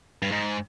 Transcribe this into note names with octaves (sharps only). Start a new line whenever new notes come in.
G2
G#2